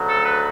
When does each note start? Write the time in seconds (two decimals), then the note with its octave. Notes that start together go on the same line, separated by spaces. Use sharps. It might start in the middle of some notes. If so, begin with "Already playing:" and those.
Already playing: D2 C#3 F#3
0.08 A4
0.23 B4